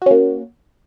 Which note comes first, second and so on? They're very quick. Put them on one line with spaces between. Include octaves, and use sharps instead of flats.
F#4 C#4 A#3